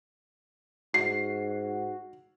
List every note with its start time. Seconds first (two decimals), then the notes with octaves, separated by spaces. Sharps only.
0.94 G#2 F#4 C7